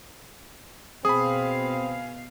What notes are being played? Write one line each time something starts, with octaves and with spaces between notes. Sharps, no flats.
B2 C4 G#4 F5 B5 D#6